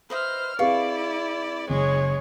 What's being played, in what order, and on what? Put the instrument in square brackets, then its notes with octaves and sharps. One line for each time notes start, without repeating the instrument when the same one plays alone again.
[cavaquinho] B4 D#5 E5 [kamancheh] C5 F6
[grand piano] C4 G#4 B4 [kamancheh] E4 D5 [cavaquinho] F5 C#6
[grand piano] F#1 [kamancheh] G#3 G#4 [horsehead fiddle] C#5